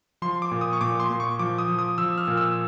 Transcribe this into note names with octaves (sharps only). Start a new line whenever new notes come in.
F3 C6
D6
A#2
D#6
C#6
A#2 D6
C6
A#2
C#6
F3 D6
D#6
F3
D#6
F3 E6
F6
A#2
E6